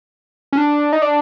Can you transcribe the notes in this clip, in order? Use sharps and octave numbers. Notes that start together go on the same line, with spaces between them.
C#4
D4
D#4
D4